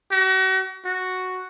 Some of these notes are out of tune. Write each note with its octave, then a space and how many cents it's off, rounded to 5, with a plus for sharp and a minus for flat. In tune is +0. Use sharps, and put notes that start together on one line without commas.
F#4 +35
F#4 +0